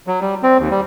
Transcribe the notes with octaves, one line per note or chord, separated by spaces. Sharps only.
F#3
G3
C4
D#2
G3